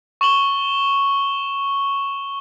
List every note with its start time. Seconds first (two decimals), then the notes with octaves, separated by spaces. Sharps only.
0.21 C#6 E7 F#7 G7